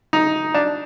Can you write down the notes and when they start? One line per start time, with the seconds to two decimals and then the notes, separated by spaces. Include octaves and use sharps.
0.13 D#4
0.54 D4